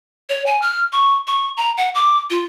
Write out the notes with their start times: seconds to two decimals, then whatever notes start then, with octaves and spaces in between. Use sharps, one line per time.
0.29 C#5
0.46 G#5
0.62 F6
0.93 C#6
1.27 C#6
1.57 A#5
1.77 F#5
1.95 D6
2.30 F4